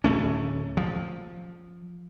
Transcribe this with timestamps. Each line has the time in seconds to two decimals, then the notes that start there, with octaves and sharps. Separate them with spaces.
0.04 D1 A3 C#4
0.77 F3